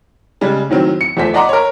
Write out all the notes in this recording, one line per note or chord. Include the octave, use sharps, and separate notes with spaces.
C#3 G3 G#3
A2 D#3 F#3 C4
C#7
E2 F3 A3 C5 B6
D5 D#5 F#5 A#5 C6 D6
A#4 C#5